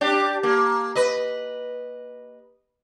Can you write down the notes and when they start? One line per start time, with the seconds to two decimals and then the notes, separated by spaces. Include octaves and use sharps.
0.01 D4 G4
0.43 A#3
0.95 B4 D#5